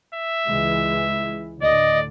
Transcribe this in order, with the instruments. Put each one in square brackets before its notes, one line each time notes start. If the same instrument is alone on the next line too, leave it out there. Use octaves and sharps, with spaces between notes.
[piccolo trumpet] E5
[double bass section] C#2 E3 G#3
[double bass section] D2 A2 D3 [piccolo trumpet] D5 [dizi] D#5